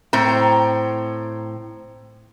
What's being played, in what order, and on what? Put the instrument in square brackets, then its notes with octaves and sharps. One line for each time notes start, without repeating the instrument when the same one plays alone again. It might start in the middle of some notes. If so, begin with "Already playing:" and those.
[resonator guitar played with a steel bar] A2 C4 A#5